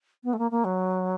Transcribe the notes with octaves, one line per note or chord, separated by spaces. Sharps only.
B3
A3
A#3
A#3
F#3